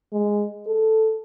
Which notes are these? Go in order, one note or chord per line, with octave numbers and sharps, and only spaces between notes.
G#3
A4